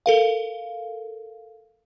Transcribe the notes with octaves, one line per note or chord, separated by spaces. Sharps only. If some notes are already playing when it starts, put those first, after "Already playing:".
A4 A#4 F5